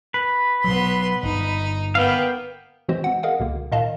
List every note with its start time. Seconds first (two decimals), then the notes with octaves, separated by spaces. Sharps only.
0.14 B4
0.64 B2 F#3 B3 C6
1.23 G1 D#4
1.95 A#3 B3 F5 G5
2.88 E3 G#3 C4 F#4 C5 D#5
3.04 C4 F#5
3.23 G#4 A#4 D#5 F5 F#5
3.40 C#2 B2 D3 A#3
3.72 A#2 D#3 D#5 F5 A5